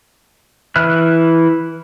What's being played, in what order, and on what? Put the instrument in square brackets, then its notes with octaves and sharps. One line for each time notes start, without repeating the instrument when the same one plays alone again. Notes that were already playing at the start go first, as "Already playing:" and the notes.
[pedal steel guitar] E3 E4 F6 F#6